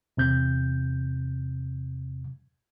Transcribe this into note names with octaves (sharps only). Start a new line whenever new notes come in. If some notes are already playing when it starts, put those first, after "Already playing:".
E2 C3 G6